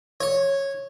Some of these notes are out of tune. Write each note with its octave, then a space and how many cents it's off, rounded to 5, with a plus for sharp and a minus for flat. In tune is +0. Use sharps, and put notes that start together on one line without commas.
C#5 -10